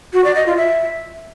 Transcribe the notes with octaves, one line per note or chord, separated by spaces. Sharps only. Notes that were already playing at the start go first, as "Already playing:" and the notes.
F#4
D5
D#5
F4
E5